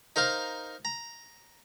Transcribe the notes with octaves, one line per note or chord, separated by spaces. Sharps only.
D#4 A#4 C5 F5
A#5